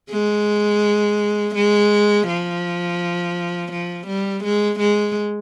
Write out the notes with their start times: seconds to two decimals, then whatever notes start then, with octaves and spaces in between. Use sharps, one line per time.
0.11 G#3
1.55 G#3
2.27 F3
3.72 F3
4.07 G3
4.44 G#3
4.79 G#3